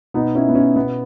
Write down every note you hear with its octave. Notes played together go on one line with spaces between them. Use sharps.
B2 B3 D#4
C#4 E4
B3
C#4
B2 B3